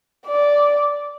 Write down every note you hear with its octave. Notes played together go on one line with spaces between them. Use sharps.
D5